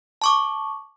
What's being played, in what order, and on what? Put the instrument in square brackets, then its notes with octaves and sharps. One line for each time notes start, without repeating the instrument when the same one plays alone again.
[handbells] A5 C#6 D6